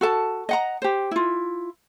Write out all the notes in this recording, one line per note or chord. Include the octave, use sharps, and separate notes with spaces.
F#4 A4 A5
D#5 F#5 A#5
G4 C5
E4 F4